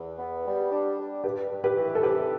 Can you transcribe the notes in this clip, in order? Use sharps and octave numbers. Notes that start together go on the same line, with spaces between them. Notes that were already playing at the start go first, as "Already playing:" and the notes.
Already playing: E2
B3
G3
D4
G3
G2 G4 B4
G2
G4 B4
E3
A4
C3 G4 B4